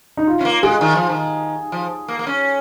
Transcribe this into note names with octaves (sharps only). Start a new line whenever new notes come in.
D#4
F4
C#4
A#3
G#3 G#4
D#3
F3
D#3
F3
A#3
A#3
C#4